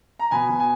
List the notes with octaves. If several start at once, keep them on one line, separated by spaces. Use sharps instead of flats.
A#5
B2 G#5 B5
B2
G#5